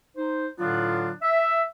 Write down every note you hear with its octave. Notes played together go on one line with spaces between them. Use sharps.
D#4 C5
A2 D3 F#3 B3 D4 F4
E5